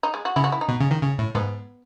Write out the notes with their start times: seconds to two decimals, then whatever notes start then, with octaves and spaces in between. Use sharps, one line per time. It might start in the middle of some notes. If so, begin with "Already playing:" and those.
0.03 D#4
0.14 G#3
0.25 F#4
0.36 C#3 E4
0.44 F#4
0.52 E4
0.61 D#4
0.68 B2
0.80 C#3
0.91 D#3
1.02 C#3
1.18 A2
1.35 G#2 B3